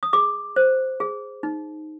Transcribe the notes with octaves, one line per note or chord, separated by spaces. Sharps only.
D#6
G#4 D6
C5
G#4
D#4